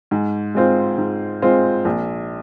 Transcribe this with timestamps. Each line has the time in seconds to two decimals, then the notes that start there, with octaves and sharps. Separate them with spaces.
0.11 G#2
0.54 G#3 C4 F4 C5
0.98 G#2
1.42 G#3 C4 F4 C5
1.85 A#1